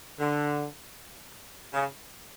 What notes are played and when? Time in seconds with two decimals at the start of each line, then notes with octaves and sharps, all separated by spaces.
0.19 D3
1.73 C#3